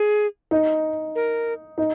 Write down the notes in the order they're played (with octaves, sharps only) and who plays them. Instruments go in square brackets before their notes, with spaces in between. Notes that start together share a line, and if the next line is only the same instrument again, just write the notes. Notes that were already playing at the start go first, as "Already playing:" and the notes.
Already playing: [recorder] G#4
[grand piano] D#4
[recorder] A#4
[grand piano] D#4